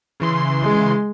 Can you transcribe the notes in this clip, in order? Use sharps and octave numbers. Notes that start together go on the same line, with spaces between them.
C#3 E3 C6
G#3